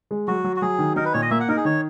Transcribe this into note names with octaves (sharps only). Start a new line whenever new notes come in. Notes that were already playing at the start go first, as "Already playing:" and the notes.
G#3
F#3 F#4
F#3
F#4
F#3 G#4
D#3
D#4 A#4
B4
A#2 C#5
D#5
A#3 E5
F#5
D#4 A#4
G#4
D#3 C#5